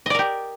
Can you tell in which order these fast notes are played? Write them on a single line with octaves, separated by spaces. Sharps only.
D#5 D5 A#4 G4